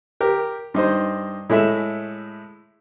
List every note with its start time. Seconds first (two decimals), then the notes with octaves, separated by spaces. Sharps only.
0.21 G4 A#4
0.74 G2 D#4 C5
1.50 A2 G#3 A3 E5